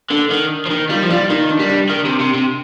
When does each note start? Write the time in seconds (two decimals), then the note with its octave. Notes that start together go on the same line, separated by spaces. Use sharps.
0.10 D3 D4
0.31 D#3
0.66 F3
0.70 D#3 D#4
0.90 G3 F4
1.03 F3
1.10 G3 F4
1.30 D#3 D#4
1.49 D4
1.59 G3
1.69 D4
1.89 D#3 A#4
2.05 C3
2.20 C3
2.34 C3